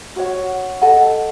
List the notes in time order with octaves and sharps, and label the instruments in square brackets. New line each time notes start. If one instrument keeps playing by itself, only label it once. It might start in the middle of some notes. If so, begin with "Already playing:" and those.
[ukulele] F#4 C#5 F#5
A4 D#5 F#5